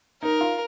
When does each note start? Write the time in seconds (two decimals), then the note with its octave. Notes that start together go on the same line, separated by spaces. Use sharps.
0.23 D#4 A#4
0.41 F4